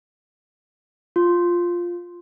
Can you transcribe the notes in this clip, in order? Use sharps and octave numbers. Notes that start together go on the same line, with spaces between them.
F4